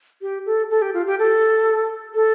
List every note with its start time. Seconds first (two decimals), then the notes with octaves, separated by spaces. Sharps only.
0.22 G4
0.46 A4
0.71 A4
0.82 G4
0.94 F4
1.07 G4
1.19 A4
2.15 A4